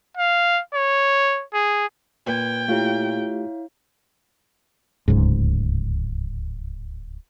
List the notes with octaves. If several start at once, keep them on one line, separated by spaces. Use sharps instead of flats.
F5
C#5
G#4
A#2 B4 G5 G#6
A3 E4 F4 G4 C#5 F5
D1 C#2 G#2